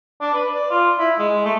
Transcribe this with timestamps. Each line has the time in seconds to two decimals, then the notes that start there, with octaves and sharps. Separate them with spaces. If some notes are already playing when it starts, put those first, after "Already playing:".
0.21 D4
0.34 B4
0.54 D5
0.71 F4
0.99 E4
1.19 G#3
1.45 A3